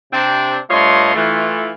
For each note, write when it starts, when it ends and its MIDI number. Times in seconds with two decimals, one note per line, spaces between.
0.12 0.58 48
0.12 0.58 60
0.12 0.58 62
0.70 1.14 43
0.70 1.14 57
0.70 1.14 65
0.70 1.14 73
0.70 1.14 75
0.70 1.14 84
1.15 1.72 52
1.15 1.72 57
1.15 1.72 65